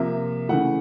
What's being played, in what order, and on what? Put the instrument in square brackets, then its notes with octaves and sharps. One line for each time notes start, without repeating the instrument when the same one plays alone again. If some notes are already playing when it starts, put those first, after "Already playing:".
Already playing: [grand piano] C3 F3 A#3 E5
C#3 E3 A3 F#5